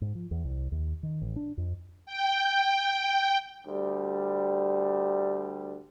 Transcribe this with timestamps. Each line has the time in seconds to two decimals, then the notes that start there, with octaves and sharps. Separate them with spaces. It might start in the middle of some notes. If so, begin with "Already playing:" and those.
0.01 G#2
0.15 F3
0.31 E2
0.44 C2
0.72 D#2
1.03 D#3
1.22 A1
1.36 D4
1.58 F2
2.06 G5
3.67 D2 G3